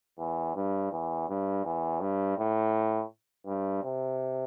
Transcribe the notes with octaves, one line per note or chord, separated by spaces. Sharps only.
E2
G2
E2
G2
E2
G2
A2
G2
C3